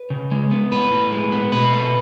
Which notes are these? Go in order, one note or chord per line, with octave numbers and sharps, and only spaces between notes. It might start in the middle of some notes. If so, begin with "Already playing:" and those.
Already playing: B4
C#3
G#3
B3
A2 B4
A2
G#3
B3
B2 B4
A3